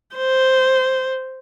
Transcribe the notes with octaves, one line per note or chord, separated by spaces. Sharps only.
C5